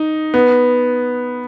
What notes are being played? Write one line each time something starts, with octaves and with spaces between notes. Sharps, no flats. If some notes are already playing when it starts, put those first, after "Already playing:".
Already playing: D#4
B3